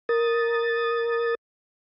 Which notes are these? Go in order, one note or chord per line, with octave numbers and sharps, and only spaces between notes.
A#4 D#6 A6